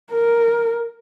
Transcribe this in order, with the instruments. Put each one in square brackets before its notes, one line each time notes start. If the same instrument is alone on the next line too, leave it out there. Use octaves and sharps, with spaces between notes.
[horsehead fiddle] A#4